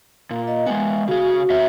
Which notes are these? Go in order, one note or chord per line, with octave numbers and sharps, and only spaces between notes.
A#2
D#5
G#3 B3 G#5
C#3 F#4 G#4
C4 C#5 E5